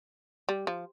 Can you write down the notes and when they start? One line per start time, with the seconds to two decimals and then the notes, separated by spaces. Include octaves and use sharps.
0.49 G3
0.67 F3